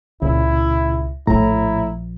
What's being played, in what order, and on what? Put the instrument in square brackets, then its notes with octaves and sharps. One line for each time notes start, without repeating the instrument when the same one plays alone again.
[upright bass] C#2 [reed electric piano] A#2 C#3 [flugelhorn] E4
[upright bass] A#1 F3 [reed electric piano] A2 A#5 [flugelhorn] E4